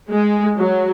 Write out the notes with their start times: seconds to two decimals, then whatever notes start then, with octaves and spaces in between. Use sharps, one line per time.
0.12 G#3
0.57 F#3